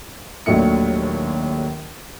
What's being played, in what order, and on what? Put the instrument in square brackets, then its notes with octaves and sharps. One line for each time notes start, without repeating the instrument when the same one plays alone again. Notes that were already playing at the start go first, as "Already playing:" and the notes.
[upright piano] A#1 D#2 F#3 A3 C#7